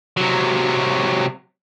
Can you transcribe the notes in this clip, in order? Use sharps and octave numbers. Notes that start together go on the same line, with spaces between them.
C3 F#3